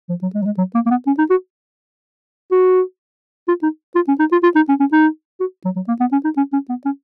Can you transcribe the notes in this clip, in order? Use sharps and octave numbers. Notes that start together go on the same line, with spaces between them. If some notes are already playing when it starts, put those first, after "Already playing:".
F3
F#3
G#3
F#3
G#3
F#3
A#3
A#3
B3
C#4
D#4
F#4
F#4
F4
D#4
F4
C#4
D#4
F4
F4
D#4
C#4
C#4
D#4
F#4
F#3
F#3
A#3
B3
C#4
D#4
C#4
C#4
B3
C#4